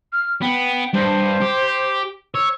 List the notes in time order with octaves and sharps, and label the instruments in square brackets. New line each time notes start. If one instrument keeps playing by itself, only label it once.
[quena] F6
[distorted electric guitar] B3 [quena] G5
[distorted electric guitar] G2 [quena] C5
[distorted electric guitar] G4
[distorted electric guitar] C#5 [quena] E6